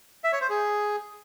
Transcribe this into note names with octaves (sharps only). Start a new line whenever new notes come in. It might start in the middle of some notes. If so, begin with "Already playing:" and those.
E5
C#5
C5
G#4